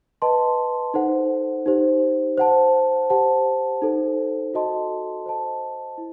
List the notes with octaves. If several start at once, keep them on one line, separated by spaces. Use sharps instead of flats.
B4 D#5 A5 C6
D#4 A4 C5 F#5
D#4 G4 C5
C5 F#5 A5
G4 C5 F#5 A5
D#4 A4 C5
F#4 A4 D#5 A5 C6
C5 D#5 A5
E4